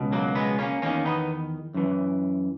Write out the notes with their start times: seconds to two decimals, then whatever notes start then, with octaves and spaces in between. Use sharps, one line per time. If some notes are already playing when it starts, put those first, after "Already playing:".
Already playing: C#2 B2
0.13 F#3 A#3
0.35 G#3 B3
0.59 A#3 C#4
0.82 E2 D#3 A#3 C#4
1.05 B3 D#4
1.74 F#2 E3